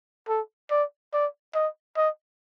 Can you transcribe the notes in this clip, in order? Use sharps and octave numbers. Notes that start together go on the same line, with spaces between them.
A4
D5
D5
D#5
D#5